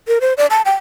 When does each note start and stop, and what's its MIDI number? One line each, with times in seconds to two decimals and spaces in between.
0.08 0.19 70
0.21 0.34 72
0.37 0.46 74
0.51 0.62 81
0.65 0.74 79